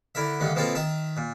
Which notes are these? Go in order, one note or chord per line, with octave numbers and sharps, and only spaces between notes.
D3 E4 A#4 E5
G2 D3 D#3 A3
B2 F3 A#3 C4 A4 A#4
D#3 E5 A5 A#5
A#2